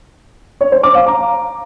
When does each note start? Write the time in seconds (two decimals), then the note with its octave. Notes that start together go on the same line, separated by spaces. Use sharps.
0.61 C#5
0.72 C5
0.83 D6
0.95 F5
1.06 A#5